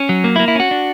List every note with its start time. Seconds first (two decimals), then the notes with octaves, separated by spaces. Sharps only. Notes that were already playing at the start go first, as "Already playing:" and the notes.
Already playing: C#4
0.09 F#3
0.24 A#3
0.36 E4
0.39 A#3
0.48 E4
0.55 C#4 F#4
0.71 D4